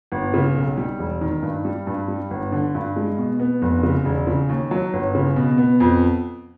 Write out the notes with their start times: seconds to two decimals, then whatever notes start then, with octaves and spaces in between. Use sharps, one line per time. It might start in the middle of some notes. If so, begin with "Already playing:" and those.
0.12 G1
0.34 C#3
0.56 B1
0.77 G3
0.99 E1
1.21 D#3
1.42 G2
1.65 G3
1.87 G2
2.08 G3
2.31 G1
2.52 D3
2.75 G2
2.96 G#3
3.18 B2
3.40 B3
3.62 F1
3.83 C#3
4.05 E1
4.27 C#3
4.49 D#2
4.71 F#3
4.93 G1
5.15 C#3
5.36 B2
5.58 B3
5.80 F2